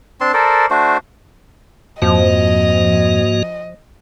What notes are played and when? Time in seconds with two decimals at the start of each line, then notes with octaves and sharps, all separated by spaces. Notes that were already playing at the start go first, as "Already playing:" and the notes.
0.21 C4 D4 A5 C6
0.34 A4 A#4 C5 D5
0.70 A3 D4 F#4 C5
2.02 F2 G#2 F3 A#3 F#4 D#5